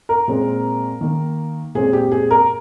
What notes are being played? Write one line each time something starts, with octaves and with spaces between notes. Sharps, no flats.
A#4
A#2 G#3 C4
D#3 A#3
A#2 G#3 C4 G#4
G4
G#4
A#4